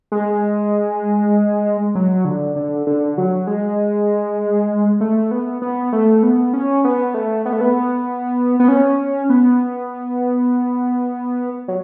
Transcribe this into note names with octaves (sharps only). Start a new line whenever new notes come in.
G#3
F#3
D3
D3
D3
F#3
G#3
A3
B3
B3
A3
B3
C#4
B3
A3
B3
A3
B3
B3
C#4
B3
F#3